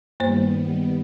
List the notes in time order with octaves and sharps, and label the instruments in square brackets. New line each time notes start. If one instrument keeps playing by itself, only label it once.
[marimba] G2 A#3 C5 [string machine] D#3 G3 B3